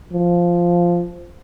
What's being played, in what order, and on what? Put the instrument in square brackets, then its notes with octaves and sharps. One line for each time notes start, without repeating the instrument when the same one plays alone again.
[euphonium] F3